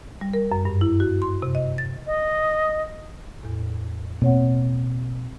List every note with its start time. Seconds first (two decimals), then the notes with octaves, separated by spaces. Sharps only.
0.21 G3
0.34 A#4
0.52 F#2
0.65 G2
0.81 E4
1.00 F#4
1.22 C6
1.42 C3
1.55 D#5
1.78 A6
2.07 D#5
3.43 E2 A2
4.22 B2 A#3 C4 C#5 F#5